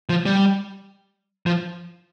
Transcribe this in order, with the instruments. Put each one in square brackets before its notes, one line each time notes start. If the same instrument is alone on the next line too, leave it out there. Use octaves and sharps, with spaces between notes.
[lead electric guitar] F3
G3
F3